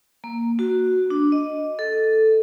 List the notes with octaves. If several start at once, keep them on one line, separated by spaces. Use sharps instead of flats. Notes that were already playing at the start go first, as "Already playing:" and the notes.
A#3
F#4
D4
D#5
A4